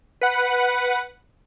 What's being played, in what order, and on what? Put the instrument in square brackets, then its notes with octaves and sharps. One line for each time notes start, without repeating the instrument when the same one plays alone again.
[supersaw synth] B4 F#5